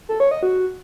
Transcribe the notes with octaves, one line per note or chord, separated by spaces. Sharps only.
A4
C#5
D#5
F#4